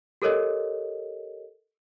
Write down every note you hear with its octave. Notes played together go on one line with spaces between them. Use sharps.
G4 A4 A#4 C#5 D#5